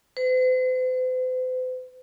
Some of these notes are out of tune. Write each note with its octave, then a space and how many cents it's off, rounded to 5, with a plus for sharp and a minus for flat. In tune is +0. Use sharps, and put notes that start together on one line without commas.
C5 -45